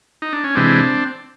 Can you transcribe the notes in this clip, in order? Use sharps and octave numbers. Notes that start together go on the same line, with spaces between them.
D#4
D4
C#4
C3 E3 G#3 C4 D4